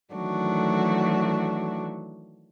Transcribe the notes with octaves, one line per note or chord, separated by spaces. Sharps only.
D#3 E3 F#3 A3 D4 F#4